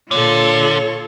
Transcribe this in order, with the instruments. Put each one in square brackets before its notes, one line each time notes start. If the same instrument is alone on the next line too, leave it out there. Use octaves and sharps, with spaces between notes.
[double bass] A#2 [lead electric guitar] D3 [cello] F4 A4 [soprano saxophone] C#5